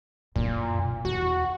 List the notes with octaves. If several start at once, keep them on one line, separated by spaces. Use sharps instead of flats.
F#2 A#2 E4
B2
E2 F#4